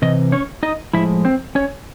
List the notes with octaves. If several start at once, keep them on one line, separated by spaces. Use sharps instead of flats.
C3 E3 D#5
C#4 C#5
D#4 D#5
A2 F3 G#3 E4 E5
C4 C5
C#4 C#5